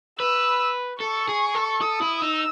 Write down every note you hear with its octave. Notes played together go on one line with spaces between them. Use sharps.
B4 E6
A4 C#6
G#4
A4
A4 D#6
E4
D#4 E6